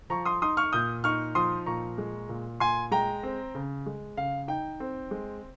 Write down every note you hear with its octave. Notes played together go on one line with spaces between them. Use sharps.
F3 A#5 C#6
C6 D#6
D#4 C6 D#6
C#6 F6
A#2 D#6 G6
D#4 C#6 F6
F3 C6 D#6
A#2 A#5 C#6
G#3
A#2
A#2 G#5 C6
G#3 G5 A#5
C4
C#3
G#3
C#3 F5
D#4 G5
C4
G#3